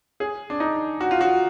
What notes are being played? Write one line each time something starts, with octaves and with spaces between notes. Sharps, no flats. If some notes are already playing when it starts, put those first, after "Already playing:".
G#4
D4
D#4
F#4
F4
F#4